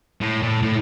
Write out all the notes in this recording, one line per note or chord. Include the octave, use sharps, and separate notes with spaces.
A2
A#2
A2
A2